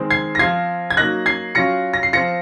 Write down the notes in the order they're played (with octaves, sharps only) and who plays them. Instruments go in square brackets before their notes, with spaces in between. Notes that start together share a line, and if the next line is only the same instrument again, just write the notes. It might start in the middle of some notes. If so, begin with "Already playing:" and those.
Already playing: [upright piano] D#3 G#3 C4
G#6 C7
A#6
F3 C4 F4 G#6 C7
G#6
F#3 A#3 D#4 F#6 A#6
G#6 C7
F#3 C#4 F4 A#6 C#7
A#6
C7
F3 C4 F4 A#6 C#7